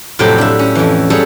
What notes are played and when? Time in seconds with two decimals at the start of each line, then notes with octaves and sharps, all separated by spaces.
0.19 F2 A2 C3 F#3 G4 G5
0.38 D4 E5
0.59 C#4
0.75 F2 E3
1.10 F#3 G3 G#4 A4 C#5